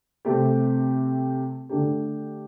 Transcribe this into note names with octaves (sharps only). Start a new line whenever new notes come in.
C3 A3 C4 G4
D3 A3 D4 G4